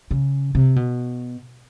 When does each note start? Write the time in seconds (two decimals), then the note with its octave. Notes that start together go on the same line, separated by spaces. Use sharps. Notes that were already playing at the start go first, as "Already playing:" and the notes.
0.11 C#3
0.55 C3
0.76 B2